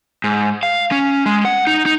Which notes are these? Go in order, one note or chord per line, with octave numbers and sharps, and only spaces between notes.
G#2
F5
C#4
G#3
F#5
D#4
D#4